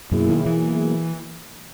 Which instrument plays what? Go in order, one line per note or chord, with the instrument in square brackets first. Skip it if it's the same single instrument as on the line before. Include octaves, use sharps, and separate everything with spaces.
[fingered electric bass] F#2 [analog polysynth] B2 F#3 A#3 E4 G#4
[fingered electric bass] D#3
E3